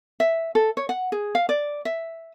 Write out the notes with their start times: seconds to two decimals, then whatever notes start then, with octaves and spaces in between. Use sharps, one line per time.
0.20 E5
0.55 A4
0.77 C#5
0.89 F#5
1.12 G#4
1.35 F5
1.49 D5
1.85 E5